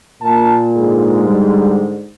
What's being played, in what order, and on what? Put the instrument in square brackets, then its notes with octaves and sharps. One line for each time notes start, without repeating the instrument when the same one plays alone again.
[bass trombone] A#2 [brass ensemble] A#3 A#4 A5
[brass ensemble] G#2 D3 G#3
[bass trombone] G3